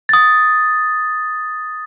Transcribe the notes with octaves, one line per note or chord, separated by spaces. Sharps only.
D#6 A6